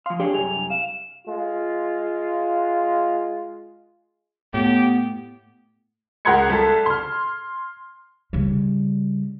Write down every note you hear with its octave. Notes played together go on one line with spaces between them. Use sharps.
F3 F5 C6
D4 G4 G#4 C#5
C2 F#2 G#4 F7
F5 E7
G#3 F4
A2 B3 G4
C#2 A#4 F#5 C6 G#6 C#7
C2 A4
C6 F6
C#3 G3